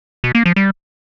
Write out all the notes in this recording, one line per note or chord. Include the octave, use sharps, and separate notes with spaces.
B2
A#3
F3
G3